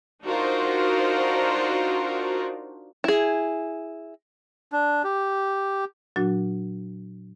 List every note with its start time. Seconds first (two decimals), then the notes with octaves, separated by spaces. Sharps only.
0.25 D4 D#4 F4 F#4 A#4 C5
3.04 E4 G#4
4.72 D4
5.04 G4
6.16 A#2 F#3 D4 F#4